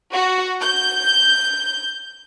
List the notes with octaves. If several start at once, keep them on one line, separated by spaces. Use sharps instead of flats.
F#4
G6